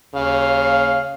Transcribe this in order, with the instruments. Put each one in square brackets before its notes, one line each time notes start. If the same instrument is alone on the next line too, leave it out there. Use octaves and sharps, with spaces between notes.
[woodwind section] D#2 F5 [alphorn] C#3